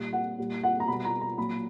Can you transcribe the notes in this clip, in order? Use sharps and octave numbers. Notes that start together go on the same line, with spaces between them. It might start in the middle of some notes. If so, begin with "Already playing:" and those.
Already playing: A#2 G3
F#5
A#2 G3
F#5
A#5
B2 G3 B5
A#5
A#5
A#2 F#3 B5